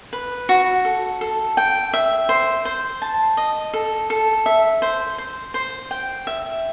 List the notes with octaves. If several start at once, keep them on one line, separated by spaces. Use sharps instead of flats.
B4
F#4
A4
A4
G5
E5
C5
C5
A5
D#5
A4
A4
E5
C5
C5
C5
G5
E5